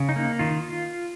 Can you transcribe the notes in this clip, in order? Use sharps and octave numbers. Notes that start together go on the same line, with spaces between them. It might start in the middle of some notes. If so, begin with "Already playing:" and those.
Already playing: C#3
D#4
A#3
D#3 F4